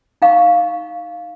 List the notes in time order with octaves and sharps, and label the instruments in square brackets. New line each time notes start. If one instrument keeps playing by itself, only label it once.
[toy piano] D#4 F5 C#6